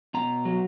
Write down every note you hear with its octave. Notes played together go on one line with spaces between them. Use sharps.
B2 A#5
F#3